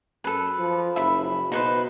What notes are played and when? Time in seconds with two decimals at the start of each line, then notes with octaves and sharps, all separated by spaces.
0.24 F#2 A4 B4
0.59 F3
0.96 F#1 E5 B5
1.52 B2 D#4 B4 C5